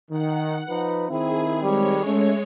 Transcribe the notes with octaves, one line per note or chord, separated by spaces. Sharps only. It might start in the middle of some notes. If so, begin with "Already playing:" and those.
D#3 F#5
F3 D#4 B4
D#3 C4 E4 G#4
G3 G#3 C#5
A3 C#4